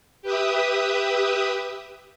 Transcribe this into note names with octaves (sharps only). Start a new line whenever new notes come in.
G4 B4 E5 D#6